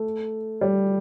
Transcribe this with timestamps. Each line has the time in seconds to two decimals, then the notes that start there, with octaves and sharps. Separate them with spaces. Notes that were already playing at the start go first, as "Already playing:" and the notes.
Already playing: A3
0.61 G3